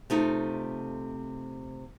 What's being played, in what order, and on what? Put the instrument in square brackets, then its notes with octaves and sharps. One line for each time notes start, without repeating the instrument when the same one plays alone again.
[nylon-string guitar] C3 A3 D#4 F4